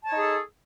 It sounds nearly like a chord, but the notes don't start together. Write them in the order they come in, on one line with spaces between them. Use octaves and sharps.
A5 C#5 D#4 G#4 A4